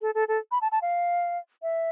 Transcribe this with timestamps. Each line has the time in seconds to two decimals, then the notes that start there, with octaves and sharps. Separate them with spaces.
0.02 A4
0.15 A4
0.28 A4
0.51 B5
0.62 A5
0.72 A5
0.82 F5
1.62 E5